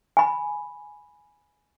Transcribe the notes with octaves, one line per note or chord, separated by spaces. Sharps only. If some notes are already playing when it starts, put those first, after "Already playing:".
G#5 B5